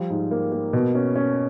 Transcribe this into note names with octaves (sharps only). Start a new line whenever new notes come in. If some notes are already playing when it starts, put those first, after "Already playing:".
Already playing: F3 G3
G#2
A#3
A#3
B2
C#4
C#4